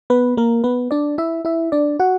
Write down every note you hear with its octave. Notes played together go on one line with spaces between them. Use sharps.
B3 B4
A#3 A#4
B3 B4
D4 D5
E4 E5
E4 E5
D4 D5
F#4 F#5